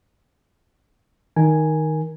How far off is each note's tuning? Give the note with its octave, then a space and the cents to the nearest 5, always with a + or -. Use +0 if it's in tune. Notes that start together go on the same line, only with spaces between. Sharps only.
D#3 +5 A#4 +10 G#5 +0